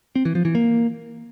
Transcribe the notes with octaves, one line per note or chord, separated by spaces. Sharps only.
C4
E3
F3
E3
A#3